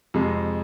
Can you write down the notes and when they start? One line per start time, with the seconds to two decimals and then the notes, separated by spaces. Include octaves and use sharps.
0.14 F2 C3 G#3